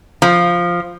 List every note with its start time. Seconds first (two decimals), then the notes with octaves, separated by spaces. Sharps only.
0.22 F3